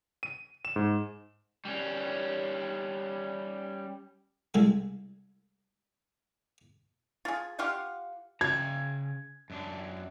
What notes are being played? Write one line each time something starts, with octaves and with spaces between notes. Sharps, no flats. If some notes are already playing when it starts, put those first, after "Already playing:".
D#7
E7
G#2
G3 C#4
C2 G#3 A4
F4 G#4
F4 G4 F5 F#5
C#3 A#5 G#6
F#2 D4